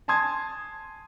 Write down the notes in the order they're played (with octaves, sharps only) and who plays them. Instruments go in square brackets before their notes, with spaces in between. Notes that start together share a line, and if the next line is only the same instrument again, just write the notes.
[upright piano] G#5 A5 C6 D#6 G#6